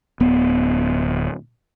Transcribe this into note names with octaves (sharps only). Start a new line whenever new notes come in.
D1 B3